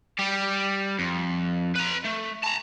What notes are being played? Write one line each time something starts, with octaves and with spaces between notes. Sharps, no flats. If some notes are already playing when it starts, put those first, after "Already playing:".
G3 G4
F2
B4 A#5
A3
A5 A#5